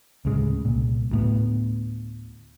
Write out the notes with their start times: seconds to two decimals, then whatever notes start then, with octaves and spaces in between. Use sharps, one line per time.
0.25 D2 A2 C#3 G#3
0.65 C2 A#2
1.11 D2 A2 B3